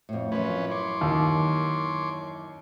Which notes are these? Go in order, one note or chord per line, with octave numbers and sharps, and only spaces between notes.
F2 A2
F#2 E3 F3 C#4 B4
C#5 C6 D6
D#2